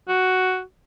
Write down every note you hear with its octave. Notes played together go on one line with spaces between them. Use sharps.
F#4